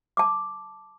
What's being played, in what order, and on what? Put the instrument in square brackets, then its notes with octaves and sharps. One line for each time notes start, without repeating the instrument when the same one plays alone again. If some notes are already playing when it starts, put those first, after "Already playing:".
[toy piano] A5 D6